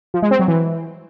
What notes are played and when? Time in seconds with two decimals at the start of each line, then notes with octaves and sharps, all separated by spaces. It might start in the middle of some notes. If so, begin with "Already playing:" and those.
0.14 F3
0.22 G#3
0.31 C4
0.39 F#3
0.48 E3